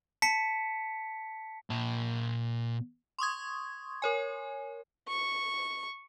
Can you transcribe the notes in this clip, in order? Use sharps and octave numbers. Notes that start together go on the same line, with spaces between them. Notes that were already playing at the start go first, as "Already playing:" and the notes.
A5 B6 C#7
A#2 A5
C6 C#6 D#6 G#6
A#4 C#5 G#5
C#6